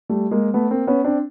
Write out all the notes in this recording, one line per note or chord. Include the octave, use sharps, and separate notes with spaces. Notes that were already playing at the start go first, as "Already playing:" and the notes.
G3 A3
G#3 A#3
A3 B3
A#3 C4
B3 C#4
C4 D4